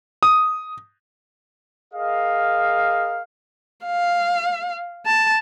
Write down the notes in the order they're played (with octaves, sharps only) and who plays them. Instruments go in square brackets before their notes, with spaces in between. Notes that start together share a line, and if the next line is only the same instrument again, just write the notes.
[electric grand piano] D#6
[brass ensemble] G#4 A#4 D#5 F5
[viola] F5
A5